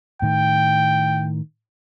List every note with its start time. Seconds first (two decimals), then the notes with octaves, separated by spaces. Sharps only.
0.22 A2 D#3 G5